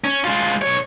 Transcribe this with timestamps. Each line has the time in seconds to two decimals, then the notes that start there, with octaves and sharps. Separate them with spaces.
0.04 C#4
0.25 G#3 F4
0.62 B1 C#5